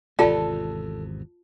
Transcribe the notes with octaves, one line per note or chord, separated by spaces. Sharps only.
G#1 E2 C3 F4 A4 D5 A5